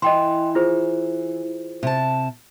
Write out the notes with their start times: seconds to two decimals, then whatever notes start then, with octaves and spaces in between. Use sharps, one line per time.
0.02 E3 D#5 G5 C6
0.55 F4 G#4 C5
1.83 C3 A5